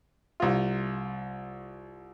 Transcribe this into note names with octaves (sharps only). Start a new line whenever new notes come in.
C2 F4